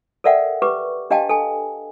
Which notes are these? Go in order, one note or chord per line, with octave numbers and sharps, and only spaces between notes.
A4 A#4 D5 E5 F#5 G5
G4 B4 C#6 D6
D4 G4 D#5 F5 G5 A5
A4 G#5